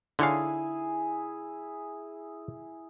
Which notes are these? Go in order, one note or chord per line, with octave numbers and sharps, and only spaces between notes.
D3 E4 G#4 C#5 F5